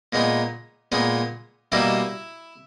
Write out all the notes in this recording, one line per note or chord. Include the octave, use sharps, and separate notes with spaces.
A#2 G#3 B3 D#4
A#2 G#3 B3 D#4
B2 G3 A#3 D#4 E4 E5